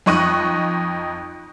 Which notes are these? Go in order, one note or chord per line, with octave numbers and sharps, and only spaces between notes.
F2 D#4 D#5 C#6 F#6 D#7